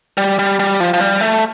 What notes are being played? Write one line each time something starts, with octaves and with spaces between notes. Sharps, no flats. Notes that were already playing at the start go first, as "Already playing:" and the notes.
G3
G3
G3
F3
F3
G3
A3